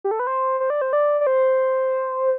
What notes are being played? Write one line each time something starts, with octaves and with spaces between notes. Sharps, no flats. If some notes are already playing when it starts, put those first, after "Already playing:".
G4
A4
B4
C5
C5
D5
C5
D5
D5
C5